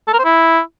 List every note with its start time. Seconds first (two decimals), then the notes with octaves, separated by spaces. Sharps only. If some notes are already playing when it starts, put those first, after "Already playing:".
0.07 A4
0.13 A#4
0.19 C5
0.24 E4